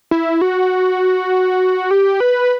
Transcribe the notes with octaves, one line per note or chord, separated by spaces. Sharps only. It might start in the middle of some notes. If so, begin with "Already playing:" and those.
E4
F#4
G4
B4